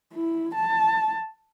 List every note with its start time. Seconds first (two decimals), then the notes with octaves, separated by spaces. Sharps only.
0.14 E4
0.55 A5